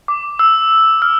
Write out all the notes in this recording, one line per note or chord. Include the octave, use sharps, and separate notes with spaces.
D6
E6
F6